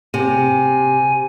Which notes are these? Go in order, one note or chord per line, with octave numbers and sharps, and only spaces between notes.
C3 G#5